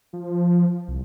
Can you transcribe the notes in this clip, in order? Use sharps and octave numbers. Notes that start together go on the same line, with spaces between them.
F3
C2